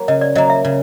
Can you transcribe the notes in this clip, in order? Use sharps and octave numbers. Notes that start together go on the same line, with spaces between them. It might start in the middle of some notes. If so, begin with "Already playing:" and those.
Already playing: F#3 A#3
C#3 D#5
D5
F#3 A#3 D#5
E5
C#3